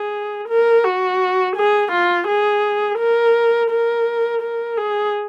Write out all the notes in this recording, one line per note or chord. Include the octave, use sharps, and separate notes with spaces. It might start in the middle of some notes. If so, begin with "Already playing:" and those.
Already playing: G#4
A#4
F#4
G#4
F4
G#4
A#4
A#4
A#4
G#4